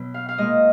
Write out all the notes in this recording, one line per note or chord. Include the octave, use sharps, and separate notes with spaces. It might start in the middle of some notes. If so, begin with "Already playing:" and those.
Already playing: B2 F#3
F5
F5
A#2 G#3 D#5